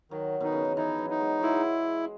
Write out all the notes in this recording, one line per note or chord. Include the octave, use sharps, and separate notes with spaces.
D#3 F#3
B2 D#4
C#3
D#3
E3 D#4
F#3
D#4
G#3
F#3 G#3 E4